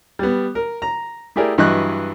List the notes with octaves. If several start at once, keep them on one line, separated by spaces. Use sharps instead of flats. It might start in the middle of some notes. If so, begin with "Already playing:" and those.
G3 B3
A#4
A#5
A3 E4 G4 G#4 A#4 D5
G2 E3 F#3 D#5 C#6 F#6